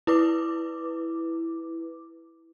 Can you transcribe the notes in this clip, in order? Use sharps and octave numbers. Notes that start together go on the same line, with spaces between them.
E4 B4 D6